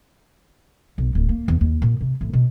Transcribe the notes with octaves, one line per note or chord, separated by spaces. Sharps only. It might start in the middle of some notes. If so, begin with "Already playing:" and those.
B1
D1
A#3
E2
D#2
A#2
C3
A1
B2